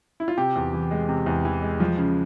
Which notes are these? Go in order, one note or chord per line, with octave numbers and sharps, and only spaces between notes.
E4
F4
C3 G4
E2
E3
G#3
C3
E2
E3
G#3
F3
C#3